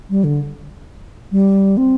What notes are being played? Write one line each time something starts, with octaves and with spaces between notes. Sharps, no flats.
G3
D3
G3
C4